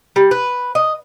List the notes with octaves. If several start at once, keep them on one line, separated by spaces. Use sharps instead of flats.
G3
B4
D#5